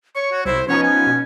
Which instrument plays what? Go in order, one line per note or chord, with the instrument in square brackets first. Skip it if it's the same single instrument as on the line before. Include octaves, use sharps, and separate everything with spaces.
[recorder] C#5 [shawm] C#6
[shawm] F#4
[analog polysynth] C2 [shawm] E4 [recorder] C5
[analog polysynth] F3 B3 D#4 [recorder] C#4 [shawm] C#5
[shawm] G#5
[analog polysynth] B2